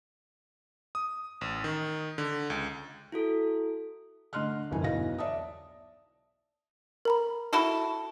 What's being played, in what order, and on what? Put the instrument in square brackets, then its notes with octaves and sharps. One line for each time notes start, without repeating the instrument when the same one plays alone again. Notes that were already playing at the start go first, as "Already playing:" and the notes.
[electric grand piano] D#6
A1
D#3
D3
C#2
[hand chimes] E4 F#4 A4
[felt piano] D3 A3 D#5 C6 F6 F#6
G1 C2 F2 G#5
B1 E2 E4 D#5 F5 A#6
D5 E5 A5 D#6
[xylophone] A#4 A#5 B5
[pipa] E4 F#4 A4